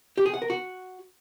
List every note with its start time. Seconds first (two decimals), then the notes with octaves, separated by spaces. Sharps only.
0.18 G4
0.26 G#4
0.34 F#5
0.42 A#4
0.50 F#4